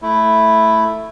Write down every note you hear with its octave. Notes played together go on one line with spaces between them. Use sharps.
A3 E4